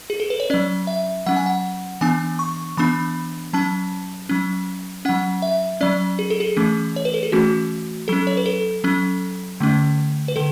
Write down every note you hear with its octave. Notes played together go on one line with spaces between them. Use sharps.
G#4
A4
B4
C#5
F#3 C#4 D5
E5
F#3 C#4 F#5
G#5
F#5
E3 B3 D4 G#5
C#6
E3 B3 D4 B5
F#3 C#4 A5
F#3 C#4
F#3 C#4 F#5
E5
F#3 C#4 D5
G#4
A4
G#4
E3 A3 C#4
C#5
B4
A4
G#4
E3 A3 C#4 F#4
F#3 C#4 A4
C#5
B4
A4
F#3 C#4
D3 A3 C#4
B4
D3 A4